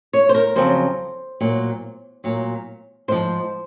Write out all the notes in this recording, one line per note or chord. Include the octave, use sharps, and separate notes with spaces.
C#5
C5
A#4
F2 C#3 F#3 C5
A#2 F#3
A#2 F#3
G#2 F3 C5